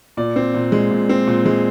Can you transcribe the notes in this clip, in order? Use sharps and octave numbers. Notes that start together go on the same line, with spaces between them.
A#2 D5
C4
A#2
G#3
A#2
C4
A#2
G#3